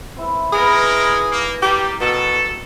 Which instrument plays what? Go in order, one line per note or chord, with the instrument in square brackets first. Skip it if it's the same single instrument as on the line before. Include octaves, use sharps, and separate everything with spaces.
[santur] C4 E4
[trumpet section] G#3 E4 A#4 [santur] B3 B4 [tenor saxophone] G#4
[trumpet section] A#3
[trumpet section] G3 [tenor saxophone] G4 [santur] A#4 D5 G5
[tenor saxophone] B2 [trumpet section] A4